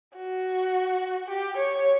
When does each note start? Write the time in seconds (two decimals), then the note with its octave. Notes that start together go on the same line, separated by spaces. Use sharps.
0.16 F#4
1.28 G4
1.57 C#5